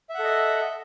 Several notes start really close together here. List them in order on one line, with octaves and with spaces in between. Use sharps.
E5 F#5 A4 D#5